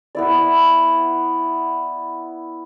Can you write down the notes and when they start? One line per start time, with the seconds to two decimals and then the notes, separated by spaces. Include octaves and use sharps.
0.15 B3 E4 D5